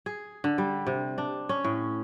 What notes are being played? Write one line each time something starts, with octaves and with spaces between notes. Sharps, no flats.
G#4
D3
G3
C3
D4
C#4
A2